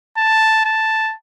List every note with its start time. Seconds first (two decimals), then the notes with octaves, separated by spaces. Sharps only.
0.17 A5
0.65 A5